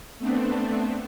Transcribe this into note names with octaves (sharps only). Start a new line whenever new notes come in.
A3 B3 C4 D4